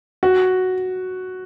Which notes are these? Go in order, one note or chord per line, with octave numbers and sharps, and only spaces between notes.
F#4